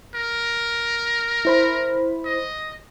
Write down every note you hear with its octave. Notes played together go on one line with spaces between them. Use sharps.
A#4
E4 C5 B5
D#5